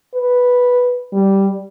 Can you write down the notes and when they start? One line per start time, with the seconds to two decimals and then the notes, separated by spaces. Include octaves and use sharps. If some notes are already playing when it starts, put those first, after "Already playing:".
0.14 B4
1.13 G3